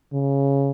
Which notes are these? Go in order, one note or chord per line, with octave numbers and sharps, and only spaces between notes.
C#3